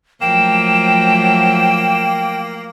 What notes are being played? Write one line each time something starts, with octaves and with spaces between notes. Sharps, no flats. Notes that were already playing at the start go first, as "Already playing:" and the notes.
F3 F#3 A3 A#3 G5 E7